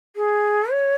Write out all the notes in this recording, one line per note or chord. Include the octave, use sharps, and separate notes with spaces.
G#4
C#5